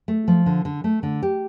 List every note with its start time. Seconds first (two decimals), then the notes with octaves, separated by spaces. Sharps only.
0.08 A3
0.28 F3
0.46 D3
0.65 D3
0.84 A3
1.03 D3
1.23 G4